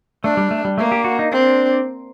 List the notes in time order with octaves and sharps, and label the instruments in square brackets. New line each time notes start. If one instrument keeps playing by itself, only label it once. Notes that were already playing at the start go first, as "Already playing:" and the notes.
[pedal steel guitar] A3 [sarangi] D4
[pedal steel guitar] G3
A3
G3
[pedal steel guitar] A3 [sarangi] A#3
[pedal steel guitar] G4
F#4
D#4
[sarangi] C4 [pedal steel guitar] D4